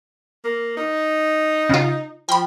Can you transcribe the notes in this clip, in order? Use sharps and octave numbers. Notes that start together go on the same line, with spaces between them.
A#3
D#4
C#3 F4
F3 G5 B5